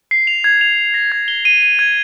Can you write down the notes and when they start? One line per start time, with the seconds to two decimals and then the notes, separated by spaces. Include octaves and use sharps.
0.11 C7
0.27 F7
0.44 G#6
0.61 F7
0.78 F7
0.94 A#6
1.12 G#6
1.28 G7
1.45 D#7
1.62 D#7
1.79 G#6